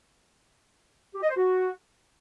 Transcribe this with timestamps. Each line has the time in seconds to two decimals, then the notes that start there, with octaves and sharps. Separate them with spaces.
1.15 G4
1.22 D#5
1.29 C5
1.37 F#4